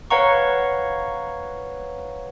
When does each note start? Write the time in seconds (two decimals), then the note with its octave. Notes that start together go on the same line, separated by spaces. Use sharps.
0.10 B4 C#5 F5 F#5 A#5 C#6